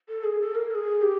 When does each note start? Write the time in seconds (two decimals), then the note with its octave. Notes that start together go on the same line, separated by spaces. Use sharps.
0.09 A4
0.24 G#4
0.40 A4
0.55 A#4
0.71 A4
0.75 G#4
1.02 G4